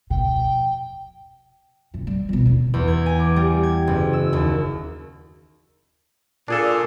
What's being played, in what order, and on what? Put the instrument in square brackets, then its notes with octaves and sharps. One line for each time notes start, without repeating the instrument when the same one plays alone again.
[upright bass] F2 B2 [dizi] G5
[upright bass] F#1 C3
G3
F2 B2
D#1 D3
[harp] E2
G#6
G#5
D6
G3
G#6
F#1
E6
D#2
[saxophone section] A#2 [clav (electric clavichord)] D4 G#4 A4